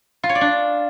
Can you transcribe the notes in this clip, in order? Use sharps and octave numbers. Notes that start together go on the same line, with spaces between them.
F4
C#5
D5
D4